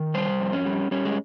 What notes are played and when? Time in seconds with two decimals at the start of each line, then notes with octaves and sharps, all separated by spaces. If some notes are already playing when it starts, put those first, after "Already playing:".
Already playing: D#3
0.14 G3 C5
0.40 F2
0.53 C#4
0.66 G3
0.91 G3 C#4
1.05 G#3